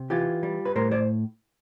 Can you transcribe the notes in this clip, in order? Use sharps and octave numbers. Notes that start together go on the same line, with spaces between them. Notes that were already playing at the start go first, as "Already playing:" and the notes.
Already playing: C3
E3 F4 G4
G3
B4
A2 A#4 C5
C5 D5